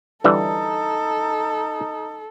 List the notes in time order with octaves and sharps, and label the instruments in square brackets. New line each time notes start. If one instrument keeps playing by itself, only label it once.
[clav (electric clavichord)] D3 E3 G3 [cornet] D#4 [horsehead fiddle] A4